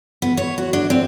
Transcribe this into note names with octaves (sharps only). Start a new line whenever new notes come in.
B3
C#5
F#4
D4
C4